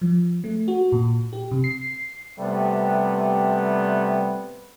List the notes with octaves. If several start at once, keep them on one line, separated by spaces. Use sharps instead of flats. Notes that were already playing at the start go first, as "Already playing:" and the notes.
F3
A3
F#4
A#2
G4
C3
C7
C3 G3 A3 B3